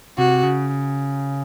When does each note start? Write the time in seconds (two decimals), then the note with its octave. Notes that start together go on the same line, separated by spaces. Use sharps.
0.18 C3 F#4
0.43 C#3
0.69 C#3